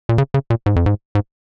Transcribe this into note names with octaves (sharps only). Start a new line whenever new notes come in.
A#2
C#3
C#3
A#2
G#2
F2
G#2
G#2